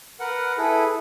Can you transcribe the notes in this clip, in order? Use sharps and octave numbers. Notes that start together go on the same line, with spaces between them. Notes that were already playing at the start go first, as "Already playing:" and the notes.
A#4 B4 F#5
E4 G#4 A4 B4